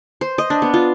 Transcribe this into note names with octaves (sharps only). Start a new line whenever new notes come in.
C5
D#5
D4
B3
F4